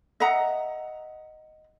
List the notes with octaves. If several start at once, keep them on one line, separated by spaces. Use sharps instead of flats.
D#5 E5 F#5 A#5